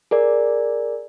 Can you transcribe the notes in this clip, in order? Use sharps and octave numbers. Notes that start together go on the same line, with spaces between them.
G#4 A#4 D5